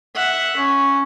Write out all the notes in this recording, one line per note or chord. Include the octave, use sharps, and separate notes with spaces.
E5 F#5
C#4